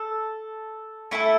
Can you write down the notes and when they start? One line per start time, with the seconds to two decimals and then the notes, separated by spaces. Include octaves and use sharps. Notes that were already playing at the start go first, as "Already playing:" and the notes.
Already playing: A4
1.11 A3 E4 A4